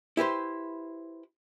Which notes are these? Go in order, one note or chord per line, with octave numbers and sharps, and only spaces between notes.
E4 G4 B4 C5